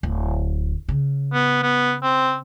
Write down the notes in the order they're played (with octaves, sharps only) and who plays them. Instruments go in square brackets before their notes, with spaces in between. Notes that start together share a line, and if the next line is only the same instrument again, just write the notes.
[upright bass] D1
C#3
[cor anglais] B3
B3
C4